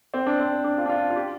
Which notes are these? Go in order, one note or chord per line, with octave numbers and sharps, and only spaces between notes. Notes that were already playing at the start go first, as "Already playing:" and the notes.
C4
D4
C4
D4
F4
D4
F4
F4
G4